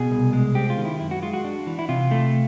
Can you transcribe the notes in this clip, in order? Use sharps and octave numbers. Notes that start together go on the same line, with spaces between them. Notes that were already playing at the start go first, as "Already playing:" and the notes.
Already playing: B2 G#4
C2
G#3
C4 G4
F4
D#3
E4
F#2 E4
F#4
G#3 F4
F#4
D4
E3
E4
C3 F4
A3